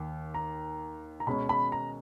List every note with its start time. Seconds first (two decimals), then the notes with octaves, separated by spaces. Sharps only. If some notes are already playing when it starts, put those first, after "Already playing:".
Already playing: D#2
0.34 A#5
1.20 A#5
1.27 B2 G#3 C#4 B5
1.49 B5
1.72 A#5